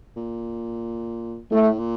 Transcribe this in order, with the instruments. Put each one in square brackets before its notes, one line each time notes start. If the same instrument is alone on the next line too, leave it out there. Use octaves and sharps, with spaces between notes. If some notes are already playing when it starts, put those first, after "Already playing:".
[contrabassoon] A#2
[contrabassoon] A2 [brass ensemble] A3
[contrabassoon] A#2